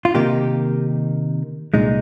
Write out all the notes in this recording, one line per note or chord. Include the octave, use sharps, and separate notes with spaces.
F4
C3 D#3 A#3 D#4 G4
C2 A#2 G#3 D#4